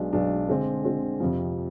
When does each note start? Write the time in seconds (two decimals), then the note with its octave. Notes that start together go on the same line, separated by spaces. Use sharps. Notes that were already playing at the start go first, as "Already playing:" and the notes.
Already playing: B1 B2 G#3 D4
0.13 B1 B2 G#3 D4
0.48 D3 G#3 C4
0.84 D3 G#3 C4
1.20 F2 C3 F3